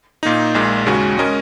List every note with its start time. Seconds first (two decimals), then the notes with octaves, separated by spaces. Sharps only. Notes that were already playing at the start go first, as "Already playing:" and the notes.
0.23 A#2 A#3 D#4
0.54 A#1 A#2 G#3
0.86 D#2 C#3 G#3 C#4 F#4
1.18 G#3 C#4 A#4 D#5